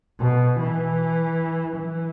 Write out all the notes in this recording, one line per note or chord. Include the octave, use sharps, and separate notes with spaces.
B2
E3
E3